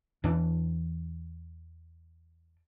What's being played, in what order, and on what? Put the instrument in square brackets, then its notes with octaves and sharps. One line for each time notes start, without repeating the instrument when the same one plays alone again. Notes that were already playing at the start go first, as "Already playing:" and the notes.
[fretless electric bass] E2 E3 D4